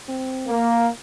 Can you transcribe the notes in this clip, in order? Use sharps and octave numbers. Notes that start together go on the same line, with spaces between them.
C4
A#3